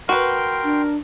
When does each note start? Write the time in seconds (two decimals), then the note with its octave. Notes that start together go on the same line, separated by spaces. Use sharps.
0.09 F#4 A#4 B4 G5 C6
0.64 D4